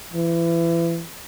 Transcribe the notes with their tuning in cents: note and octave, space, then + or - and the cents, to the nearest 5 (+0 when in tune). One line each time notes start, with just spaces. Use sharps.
E3 +30